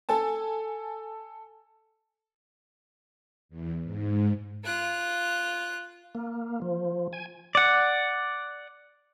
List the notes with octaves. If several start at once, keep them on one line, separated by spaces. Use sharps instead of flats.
A4 G#5 A5
E2
G#2
F4 F#6
A#3
F3
G#5
D5 F#5